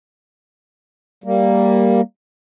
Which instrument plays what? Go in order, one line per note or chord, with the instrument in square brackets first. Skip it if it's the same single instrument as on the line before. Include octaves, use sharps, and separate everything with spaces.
[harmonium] G3 A#3